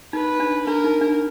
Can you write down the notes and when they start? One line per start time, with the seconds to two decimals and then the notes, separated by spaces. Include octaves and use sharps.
0.13 D#4 B4
0.40 D4
0.66 D4 A#4
0.84 D#4
1.01 D4